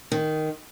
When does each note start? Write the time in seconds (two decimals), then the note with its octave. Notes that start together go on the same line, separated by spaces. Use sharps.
0.12 D#3